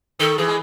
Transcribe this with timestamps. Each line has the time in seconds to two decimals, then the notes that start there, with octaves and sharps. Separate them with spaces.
0.20 D#3 A4
0.38 E3 G#4
0.48 G#3